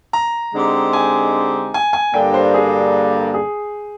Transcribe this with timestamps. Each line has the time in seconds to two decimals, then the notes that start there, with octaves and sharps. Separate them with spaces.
0.13 A#5
0.54 D3 G#3 C4 D#4 G4
0.93 G#5
1.74 G#5
1.93 G#5
2.14 G2 D3 G3 A#3 G5
2.34 C5
2.54 G#4
3.34 G#4